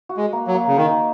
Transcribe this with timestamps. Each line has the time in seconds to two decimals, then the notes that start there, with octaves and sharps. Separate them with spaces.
0.09 F#4
0.17 G#3
0.33 A#3
0.47 F#3
0.54 A#3
0.68 C#3
0.77 D#3 D#4